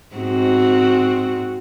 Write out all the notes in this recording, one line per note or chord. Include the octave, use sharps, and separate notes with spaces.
G#2 C4 F#4